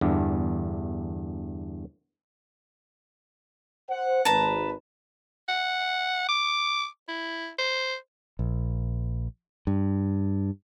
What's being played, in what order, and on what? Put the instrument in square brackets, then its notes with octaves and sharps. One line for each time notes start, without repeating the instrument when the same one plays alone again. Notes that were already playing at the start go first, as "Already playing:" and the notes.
[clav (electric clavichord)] E2 G2 D3
[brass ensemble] C5 F#5
[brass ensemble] G#1 B4 [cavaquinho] A5 A#5
[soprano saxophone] F#5
D6
E4
C5
[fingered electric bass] A#1
G2